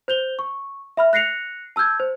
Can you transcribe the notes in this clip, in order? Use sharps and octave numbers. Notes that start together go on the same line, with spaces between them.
C5 G6 F7 G7
C#6
E5 B5 F6
F#6 A#6 C7 C#7 F7
A5 E6 F6 G6 G#6
C5